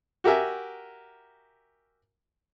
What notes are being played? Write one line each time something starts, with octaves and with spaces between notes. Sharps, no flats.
F#4 G4 A#4 E5 G#5